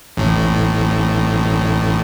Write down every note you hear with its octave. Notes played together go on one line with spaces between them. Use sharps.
A1 A2